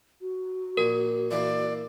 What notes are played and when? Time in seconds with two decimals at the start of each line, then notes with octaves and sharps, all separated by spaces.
0.22 F#4
0.77 A#1 A#2 A#4 G#5
1.31 A#2 E3 A#3 D5